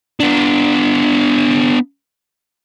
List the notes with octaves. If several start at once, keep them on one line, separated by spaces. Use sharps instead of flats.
B3 D4